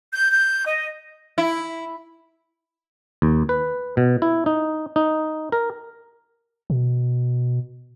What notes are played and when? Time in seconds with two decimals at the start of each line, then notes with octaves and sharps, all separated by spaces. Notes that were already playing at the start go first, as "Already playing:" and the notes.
0.13 G6
0.31 G6
0.65 D#5
1.38 E4
3.22 D#2
3.49 B4
3.97 B2
4.22 E4
4.46 D#4
4.96 D#4
5.52 A#4
6.70 B2